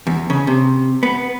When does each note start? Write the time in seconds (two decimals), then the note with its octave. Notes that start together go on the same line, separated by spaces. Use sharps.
0.07 E2
0.30 C#3
0.47 C3
1.03 B3